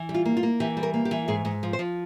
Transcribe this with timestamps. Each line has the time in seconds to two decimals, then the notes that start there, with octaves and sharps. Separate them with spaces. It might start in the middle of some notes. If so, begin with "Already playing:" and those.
Already playing: E3
0.09 G3
0.14 F4
0.25 A#3
0.37 F4
0.43 A#3
0.60 E3 G4
0.77 G3
0.83 A#4
0.94 A#3
1.05 G4
1.11 E3
1.28 G#2 G#4
1.45 G#2
1.63 F3
1.73 C5
1.79 F3